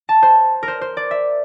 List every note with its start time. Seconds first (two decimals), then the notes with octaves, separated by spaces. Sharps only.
0.09 A5
0.23 C5
0.63 A#4
0.68 C5
0.81 C5
0.97 D5
1.11 E5